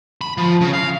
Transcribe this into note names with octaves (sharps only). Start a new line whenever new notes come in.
B5
F3
C#3
F5